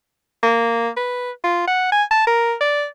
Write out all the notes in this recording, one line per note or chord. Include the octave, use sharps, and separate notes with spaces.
A#3
B4
F4
F#5
G#5
A5
A#4
D5